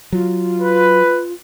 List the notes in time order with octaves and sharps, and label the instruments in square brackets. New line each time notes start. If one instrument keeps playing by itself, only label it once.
[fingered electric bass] F#3 [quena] F4
[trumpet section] B4